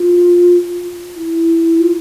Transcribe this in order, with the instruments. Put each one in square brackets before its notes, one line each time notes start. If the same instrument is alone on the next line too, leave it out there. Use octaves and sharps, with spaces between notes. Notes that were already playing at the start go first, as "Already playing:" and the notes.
Already playing: [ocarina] F4
E4
F4